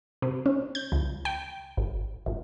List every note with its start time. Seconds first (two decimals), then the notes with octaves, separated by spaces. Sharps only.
0.22 C3
0.46 C#4
0.75 G6
0.92 C#2
1.25 G5
1.77 G#1
2.26 G#1